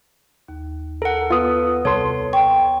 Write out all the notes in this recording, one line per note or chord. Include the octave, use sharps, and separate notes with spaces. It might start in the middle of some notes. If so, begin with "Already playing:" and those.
D#2
A4 A#4 F#5
B3 F4 B4 D#6
C2 A4 C#5 C6
G5 C#6